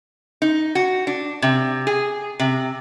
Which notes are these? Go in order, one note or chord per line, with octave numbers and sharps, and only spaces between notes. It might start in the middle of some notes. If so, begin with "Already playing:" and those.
D#4
F#4
D4
C3
G#4
C3